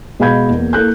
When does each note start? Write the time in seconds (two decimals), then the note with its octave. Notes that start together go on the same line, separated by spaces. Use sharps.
0.20 B2 G#3 F5 B5 G6 G#6
0.50 E2 A#3
0.73 A#3 E4 A4 F#6 G6